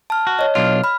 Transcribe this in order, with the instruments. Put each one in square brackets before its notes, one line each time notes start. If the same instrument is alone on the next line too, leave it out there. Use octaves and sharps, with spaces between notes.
[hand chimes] A5 F6
[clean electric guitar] F#4
[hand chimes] C#5 D#5
[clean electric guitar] B1 D4 F4 [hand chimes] F6
[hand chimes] B5 F6